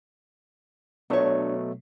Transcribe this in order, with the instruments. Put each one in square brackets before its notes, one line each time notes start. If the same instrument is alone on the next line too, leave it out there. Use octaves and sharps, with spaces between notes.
[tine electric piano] B2 F#3 A3 [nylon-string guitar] D4 C#5